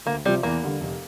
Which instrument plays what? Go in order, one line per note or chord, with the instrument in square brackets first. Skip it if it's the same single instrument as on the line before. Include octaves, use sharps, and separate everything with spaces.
[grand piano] D2 [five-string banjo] A#3
[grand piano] C3 F3 [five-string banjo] G3
[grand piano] E2 [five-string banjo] A#3
[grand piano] D3 G3
F1